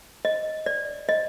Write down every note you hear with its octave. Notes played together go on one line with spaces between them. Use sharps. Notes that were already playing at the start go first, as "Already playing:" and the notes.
D#5
D5
D#5